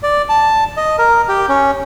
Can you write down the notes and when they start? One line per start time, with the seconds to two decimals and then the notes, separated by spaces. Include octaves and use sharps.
0.03 D5
0.29 A5
0.77 D#5
0.98 A#4
1.28 G4
1.49 C#4